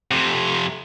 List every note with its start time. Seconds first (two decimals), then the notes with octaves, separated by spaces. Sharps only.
0.11 F2 C3